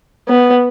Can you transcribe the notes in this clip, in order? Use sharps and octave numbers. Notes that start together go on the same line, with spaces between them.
B3